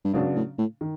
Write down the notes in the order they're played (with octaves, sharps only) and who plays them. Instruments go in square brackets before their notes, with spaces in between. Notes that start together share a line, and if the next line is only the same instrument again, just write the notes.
[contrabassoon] G2
[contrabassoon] G#2 [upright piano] C#3 F#3 B3 D4
[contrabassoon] A2
A2
[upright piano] D#3